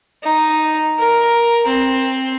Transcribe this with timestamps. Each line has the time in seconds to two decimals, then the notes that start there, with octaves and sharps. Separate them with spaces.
0.23 D#4
0.99 A#4
1.67 C4